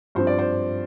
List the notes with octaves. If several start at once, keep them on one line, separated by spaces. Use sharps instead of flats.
G2 F3 C4 C5
D5
C5